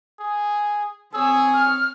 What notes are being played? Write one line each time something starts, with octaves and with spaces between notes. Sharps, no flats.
G#4
C4 G#4 C#5 E6
F6